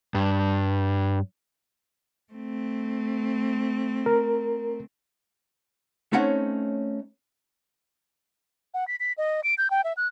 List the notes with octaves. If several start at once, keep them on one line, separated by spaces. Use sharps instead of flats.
G2
A3 C4
A#4
A3 C4 C#4 D#4 C#5 F#5
F#5
B6
B6
D#5
D7
G6
G5
E5
F#6